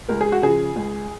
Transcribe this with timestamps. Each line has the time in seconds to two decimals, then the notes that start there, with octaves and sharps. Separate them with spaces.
0.09 C#2 A#4
0.21 G#4
0.32 F#4
0.42 C#3 F3 G#4
0.76 C#2